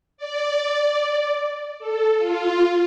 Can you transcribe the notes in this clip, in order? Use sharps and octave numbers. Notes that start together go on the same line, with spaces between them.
D5
A4
F4